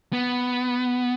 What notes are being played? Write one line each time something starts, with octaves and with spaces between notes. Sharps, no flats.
B3